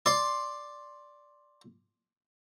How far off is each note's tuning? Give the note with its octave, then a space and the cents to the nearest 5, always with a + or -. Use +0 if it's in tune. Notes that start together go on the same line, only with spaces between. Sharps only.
D5 +0 C6 +10